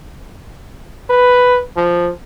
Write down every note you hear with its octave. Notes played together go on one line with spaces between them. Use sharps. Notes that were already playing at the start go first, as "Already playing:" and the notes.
B4
F3